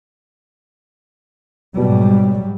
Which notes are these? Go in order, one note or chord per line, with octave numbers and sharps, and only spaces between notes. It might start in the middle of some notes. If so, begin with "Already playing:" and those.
G#2 B2 F#3 G3